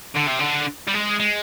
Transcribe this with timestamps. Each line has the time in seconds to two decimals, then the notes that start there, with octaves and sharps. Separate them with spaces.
0.15 D3
0.26 C3
0.39 D3
0.87 G3
0.94 G#3
1.20 G#3